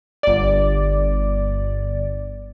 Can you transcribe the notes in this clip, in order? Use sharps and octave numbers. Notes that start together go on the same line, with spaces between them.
G1 D5